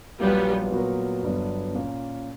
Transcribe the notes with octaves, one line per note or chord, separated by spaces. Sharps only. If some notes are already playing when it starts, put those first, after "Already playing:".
A#1 A#2 F#3 G3 A#3 B3
A#2 F#3 B3 F#4 A#4
G1 G2 F#3 B3 D4
A#2 A#3 C#4